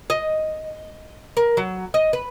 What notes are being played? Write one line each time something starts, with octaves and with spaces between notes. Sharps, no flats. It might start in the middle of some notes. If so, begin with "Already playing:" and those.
D#5
A#4
F#3
D#5
B4